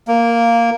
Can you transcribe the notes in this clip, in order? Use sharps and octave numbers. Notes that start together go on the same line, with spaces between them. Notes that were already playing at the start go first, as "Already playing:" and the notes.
A#3